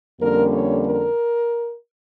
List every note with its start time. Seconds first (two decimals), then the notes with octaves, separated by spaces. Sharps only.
0.20 F2 D3 G3 A#3 C#4 A#4
0.52 C#5
0.84 A#4